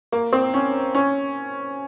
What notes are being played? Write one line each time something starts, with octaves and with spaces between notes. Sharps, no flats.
A#3
C4
C#4
C#4